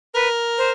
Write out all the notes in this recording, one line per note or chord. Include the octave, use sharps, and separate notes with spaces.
A#4 B4
C5